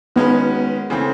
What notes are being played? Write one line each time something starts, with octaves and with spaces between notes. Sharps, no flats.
D#3 G#3 B3 C#4 F#4 B4
C#3 E3 A3 C4